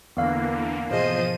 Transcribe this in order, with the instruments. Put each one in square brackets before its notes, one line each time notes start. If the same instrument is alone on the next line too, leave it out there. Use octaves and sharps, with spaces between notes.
[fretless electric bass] E2 [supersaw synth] D3 E3 A#3 [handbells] B3 F5
[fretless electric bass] G#2 B2 E3 [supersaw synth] F3 D#7 [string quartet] G#4 C5 D#5